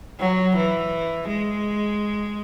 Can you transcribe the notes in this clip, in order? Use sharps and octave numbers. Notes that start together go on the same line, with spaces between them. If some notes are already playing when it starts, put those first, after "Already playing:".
F#3
E3
G#3